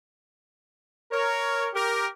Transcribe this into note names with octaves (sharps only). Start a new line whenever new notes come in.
A#4 C#5
G4 A#4